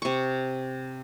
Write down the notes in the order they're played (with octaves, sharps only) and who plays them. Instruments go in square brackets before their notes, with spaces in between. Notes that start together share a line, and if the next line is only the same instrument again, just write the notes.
[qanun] C3 C#6